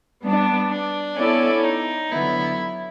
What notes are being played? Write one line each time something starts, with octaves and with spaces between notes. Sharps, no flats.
G3 B3 D4
D4
B3 C#4 E4 A4 D5
D#4
D3 F#3 B3 E4